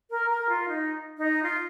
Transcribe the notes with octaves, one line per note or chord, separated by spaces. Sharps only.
A#4
A#4
F4
D#4
D#4
F4